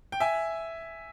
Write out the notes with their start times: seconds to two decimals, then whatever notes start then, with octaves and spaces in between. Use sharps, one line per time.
0.12 G5
0.20 E5 G#5